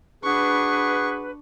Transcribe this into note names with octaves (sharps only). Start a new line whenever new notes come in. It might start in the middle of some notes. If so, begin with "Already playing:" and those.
D4 F#4 G#4 B4 C#6